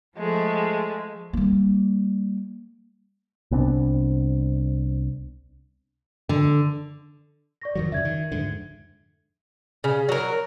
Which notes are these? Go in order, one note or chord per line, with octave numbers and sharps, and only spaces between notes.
F3 G#3 A3
G3 A#3
C2 B3 C4 D4
D3
D5 C#6 A#6
F2 D#3 F#3
F#2 C#3 E5 G#6
D#3
F2 G#2 D3
C#3
F#3 A#4